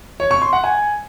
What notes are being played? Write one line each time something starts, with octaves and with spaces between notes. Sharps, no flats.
C#5
C#6
C6
F#5
G#5